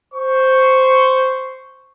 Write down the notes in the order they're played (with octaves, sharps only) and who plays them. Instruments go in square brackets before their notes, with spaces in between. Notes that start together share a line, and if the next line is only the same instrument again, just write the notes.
[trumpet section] C5 C#6